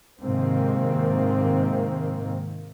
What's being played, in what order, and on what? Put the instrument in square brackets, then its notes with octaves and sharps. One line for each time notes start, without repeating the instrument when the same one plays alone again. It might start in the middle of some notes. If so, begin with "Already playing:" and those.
[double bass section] G#2 C3 D#3 A#3 C4